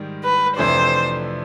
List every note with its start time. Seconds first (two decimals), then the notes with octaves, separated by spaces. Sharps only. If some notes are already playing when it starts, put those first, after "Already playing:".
Already playing: G#2 D#3 G3
0.24 B4
0.57 F2 C3 E3 A3 D4 C5